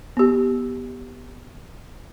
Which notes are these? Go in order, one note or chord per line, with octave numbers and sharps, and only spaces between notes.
B3 G4